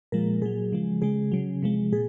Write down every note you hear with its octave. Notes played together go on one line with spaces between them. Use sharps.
A#2 F3 G#3 A#4
A#2 F#3 G#4
C#3 F3 G#3
C#3 G#3 G#4
C#3 F#3
C3 F3 G#3
A#2 G#4